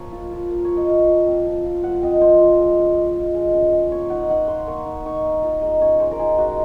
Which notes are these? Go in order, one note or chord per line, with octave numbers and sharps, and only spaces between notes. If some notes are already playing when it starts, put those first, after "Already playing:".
Already playing: F3 A#3 C#5
F4
F3
A#3
C#5
F3
D#5
F4 F5
F3
C4
F3
F4
F3 F#5
C4 D#5
F3 C5
F4
G#3
C#4
G#3
F4
G#3
C#4
G#3
A#3 C#5
D#4 F#5
D#4 F#5
A#3 C6
A#3 C#6
D#4
D#4 C#6
A#3
F4 A#5
G#3 D#5
C#4 C#5
G#3 C5
A#4
F4 G#4
G#3 F#4